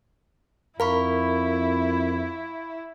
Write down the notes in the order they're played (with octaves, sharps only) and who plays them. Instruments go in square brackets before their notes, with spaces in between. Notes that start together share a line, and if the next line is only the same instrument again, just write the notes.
[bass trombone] F2 [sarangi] E4 [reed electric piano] A#4 [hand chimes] F5 B5 C#6